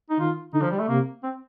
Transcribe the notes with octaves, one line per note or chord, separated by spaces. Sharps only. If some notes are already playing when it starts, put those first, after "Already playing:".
D#4
D#3 F4
D3 D#4
F3
G3
A3
C3 A#3
C4